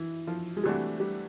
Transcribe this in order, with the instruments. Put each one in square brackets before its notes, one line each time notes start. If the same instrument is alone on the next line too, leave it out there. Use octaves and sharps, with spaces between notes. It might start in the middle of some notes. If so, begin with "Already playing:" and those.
Already playing: [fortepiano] E3
F3
G#3
[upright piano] C3 E3 A3 D4 F#4 [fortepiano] G3
[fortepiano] G3